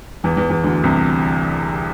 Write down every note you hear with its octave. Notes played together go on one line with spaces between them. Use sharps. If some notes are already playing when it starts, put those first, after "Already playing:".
E2 E3
E2 E3
E2 E3
D2 D3
C2 C3